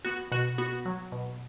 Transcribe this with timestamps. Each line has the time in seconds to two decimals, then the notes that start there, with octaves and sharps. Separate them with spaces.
0.05 B3 F#4
0.32 B2 F#4
0.58 B3 F#4
0.85 F#3
1.12 B2